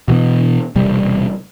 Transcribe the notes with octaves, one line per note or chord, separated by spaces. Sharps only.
B2 E3 B3
E1 C3 G3